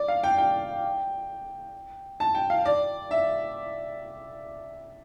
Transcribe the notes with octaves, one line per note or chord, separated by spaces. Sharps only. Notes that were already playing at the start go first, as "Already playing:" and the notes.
Already playing: D5
F5
G5
G5
A5
G5
F5
D5
E5